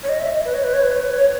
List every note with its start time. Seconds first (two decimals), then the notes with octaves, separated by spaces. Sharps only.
0.03 C#5
0.09 D#5
0.21 E5
0.33 D#5
0.45 B4
0.54 C#5
0.64 B4
0.74 C#5
0.83 B4
0.92 C#5
1.01 B4
1.14 C#5